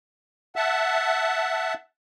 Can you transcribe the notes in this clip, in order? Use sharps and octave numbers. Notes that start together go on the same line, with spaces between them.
E5 F#5 A5